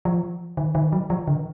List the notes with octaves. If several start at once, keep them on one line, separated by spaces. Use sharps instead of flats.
F3
D#3
D#3
F#3
F3
D3